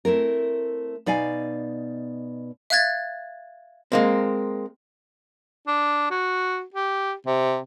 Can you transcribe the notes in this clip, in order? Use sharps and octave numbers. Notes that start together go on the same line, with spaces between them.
A3 C4 E4 A#4
B2 D#4 D5 F5 G#5
E5 F5 F#6 G#6 A6
G#3 A#3 C4
D4
F#4
G4
C3